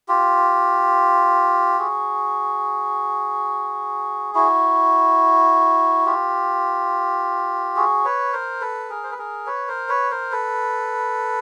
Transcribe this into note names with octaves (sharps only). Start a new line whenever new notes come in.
F4 G4
F#4 G#4
E4 F#4
F4 G4
F#4 G#4
B4 C#5
A#4 C5
A4 B4
G#4 A#4
C5
B4
G#4 A#4
B4 C#5
A#4 C5
B4 C#5
A#4 C5
A4 B4